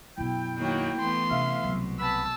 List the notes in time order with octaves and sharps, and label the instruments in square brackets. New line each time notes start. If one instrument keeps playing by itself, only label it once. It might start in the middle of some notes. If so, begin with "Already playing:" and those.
[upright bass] F#2 B2 [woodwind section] E4 G5
[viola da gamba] D#3 F#3 A#3
[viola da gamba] E3 A3 B3 [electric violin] C6
[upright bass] C3 C#4 [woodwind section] E5 F5
[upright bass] C2 F#3 [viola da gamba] B2
[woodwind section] E3 B3 B5 [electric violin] A5 E6